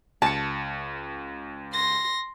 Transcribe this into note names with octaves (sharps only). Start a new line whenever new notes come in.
C#2 A5 C#7
C6 A#6